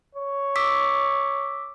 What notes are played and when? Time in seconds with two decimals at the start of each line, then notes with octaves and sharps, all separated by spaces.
0.15 C#5
0.56 D6 E6 B6